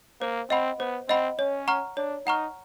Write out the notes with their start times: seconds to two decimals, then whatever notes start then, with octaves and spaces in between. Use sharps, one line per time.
0.21 A#3 C5
0.50 C4 D#5 F#5 B5
0.79 B3 C5
1.08 C4 D#5 F#5 B5
1.38 C#4 C#5
1.68 F#5 A#5 C#6 F6
1.97 D4 C#5
2.26 D#4 F#5 A#5 C#6 F6